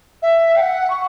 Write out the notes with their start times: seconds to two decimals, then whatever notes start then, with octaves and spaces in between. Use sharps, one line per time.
0.22 E5
0.56 G5
0.61 F#5
0.90 C#6